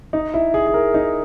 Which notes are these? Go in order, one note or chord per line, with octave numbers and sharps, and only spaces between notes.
D#4
E4
G#4
G#4
A#4
D#4